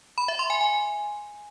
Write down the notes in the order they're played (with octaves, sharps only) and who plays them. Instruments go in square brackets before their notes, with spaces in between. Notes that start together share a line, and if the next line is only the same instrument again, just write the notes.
[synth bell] B5
E5
C6
G#5
G#5